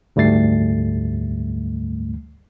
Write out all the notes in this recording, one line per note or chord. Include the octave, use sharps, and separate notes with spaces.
D2 G#2 G3 A3 A6 C7